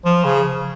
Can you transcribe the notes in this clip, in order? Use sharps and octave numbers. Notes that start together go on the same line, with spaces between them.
F3
C#3